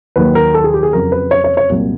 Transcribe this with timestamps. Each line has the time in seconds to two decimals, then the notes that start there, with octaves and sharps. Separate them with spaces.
0.16 D#2 D#3 F#3 B4
0.35 A#4
0.54 A4
0.64 G#4
0.74 G4
0.83 G#4
0.93 F2 C#3 F#3 A#4
1.12 B4
1.31 C#5
1.44 C#5
1.57 C#5
1.70 C2 A#2 F#3